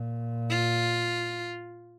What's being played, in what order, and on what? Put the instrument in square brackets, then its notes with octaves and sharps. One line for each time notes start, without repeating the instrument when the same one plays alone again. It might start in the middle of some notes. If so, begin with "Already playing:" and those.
Already playing: [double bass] A#2
[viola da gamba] F4